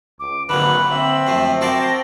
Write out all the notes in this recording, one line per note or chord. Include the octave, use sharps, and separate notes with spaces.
C#2 D6
G#1 D3 F#3 A#3 B4 F#7
C4 E5
F#2 F3 A3 C7
C4 F#4 A#4 D5 A5 C6 A#6